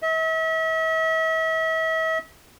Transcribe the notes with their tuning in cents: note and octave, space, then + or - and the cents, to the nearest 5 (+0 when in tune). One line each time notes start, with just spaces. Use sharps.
E5 -40